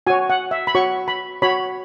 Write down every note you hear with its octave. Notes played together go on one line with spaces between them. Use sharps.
F#4 C#5 G#5
F#5
E5
B5
F#4 C#5 C#6
B5
F#4 C#5 B5